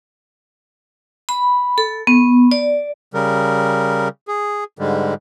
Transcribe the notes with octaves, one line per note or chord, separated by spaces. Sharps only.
B5
A4
B3
D5
C#3 G3 A#4
G#4
G#2 D3 G3 G#3